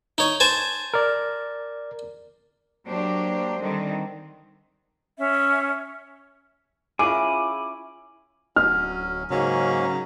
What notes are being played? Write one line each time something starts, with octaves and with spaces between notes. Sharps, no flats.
D#4 C#5
C5 G#5 A5
A#4 D5
F#3 A#3 D4 G4 C5
D3 D#3 G3 C4
C#4 E5
C#4 E4 F4 G#4 G#5 B5 D6
D1 F#3 C#4 F6
G#2 C#3 F#3 A#3 C#4